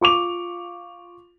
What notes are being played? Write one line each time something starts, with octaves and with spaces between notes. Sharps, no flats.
F4 C#6 D6 F7